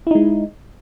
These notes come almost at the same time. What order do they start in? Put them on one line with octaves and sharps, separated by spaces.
E4 D#4 G#3